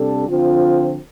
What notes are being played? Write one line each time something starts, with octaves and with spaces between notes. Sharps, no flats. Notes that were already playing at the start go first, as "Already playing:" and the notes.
Already playing: C3 G3 D4 A4
D3 F3 C4 F4